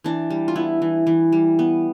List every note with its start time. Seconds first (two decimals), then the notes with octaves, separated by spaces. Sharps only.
0.04 E3 D4
0.30 G3
0.48 F4
0.56 B3 E4
0.82 E3
1.07 E3
1.32 G3
1.59 B3